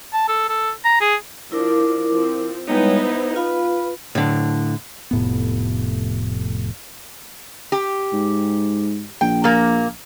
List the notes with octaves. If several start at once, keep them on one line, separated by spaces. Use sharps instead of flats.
A5
A4
A4
A#5
G#4
F3 D4 E4 A#4 D6
F3 C4
G3 G#3 B3 D#4 E4 C#5
C5
F4 B4 F5 B5
A2 D3
F1 A2 B3
G4
G#2
A#1 G5
A#2 A#3